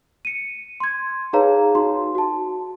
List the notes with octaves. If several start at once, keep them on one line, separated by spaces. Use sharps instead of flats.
C#7 D#7
C6 G#6
D#4 G#4 B4 C#5 F5 A#5
D#4 F#4 C6
F#4 A5